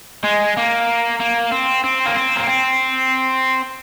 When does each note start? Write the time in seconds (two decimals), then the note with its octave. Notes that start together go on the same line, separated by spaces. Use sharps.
0.24 G#3
0.57 A#3
1.20 A#3
1.51 C4
1.84 C4
2.06 A#3
2.15 C4
2.37 A#3
2.47 C4